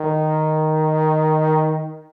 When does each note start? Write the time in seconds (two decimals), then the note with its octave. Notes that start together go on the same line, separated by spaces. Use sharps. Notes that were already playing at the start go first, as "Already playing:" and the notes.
Already playing: D#3